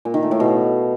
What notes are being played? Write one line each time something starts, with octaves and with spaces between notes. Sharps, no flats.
A#2
D#3
A3
A2
B2